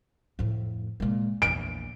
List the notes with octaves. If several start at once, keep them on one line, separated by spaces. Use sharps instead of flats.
F2 A2
A#2 G#3
A#1 E2 D7